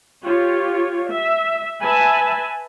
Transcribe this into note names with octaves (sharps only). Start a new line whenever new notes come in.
F4 G4 C#5
E5
B4 E5 G#5 A5 B5